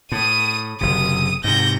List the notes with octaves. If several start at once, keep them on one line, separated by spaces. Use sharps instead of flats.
A2 D#6 D#7
F#1 C3 D#6
G#2 C3 G6 A#6